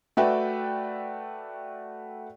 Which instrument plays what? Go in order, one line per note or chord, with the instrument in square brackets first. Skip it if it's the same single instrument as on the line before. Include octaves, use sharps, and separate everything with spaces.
[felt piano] A3 F#4 B4 D5 E5 G5